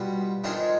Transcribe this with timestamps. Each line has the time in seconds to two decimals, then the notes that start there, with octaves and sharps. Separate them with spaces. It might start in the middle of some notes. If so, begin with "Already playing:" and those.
Already playing: B2 G3 B3 F4
0.44 G#2 D#3 G#3 D4 F4